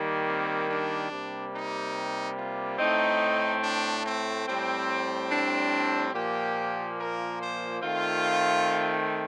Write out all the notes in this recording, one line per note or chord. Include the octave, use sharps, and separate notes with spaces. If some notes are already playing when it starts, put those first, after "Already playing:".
Already playing: D#3 G3 A#3
C4
D4
C3 G3 A#3
D#4
F4
A2 A3 C4 D#4
D4
C4
A2 G3 C4
D4
A#2 F3 A#3 G4
A#4
C5
D#3 A3 C4 F4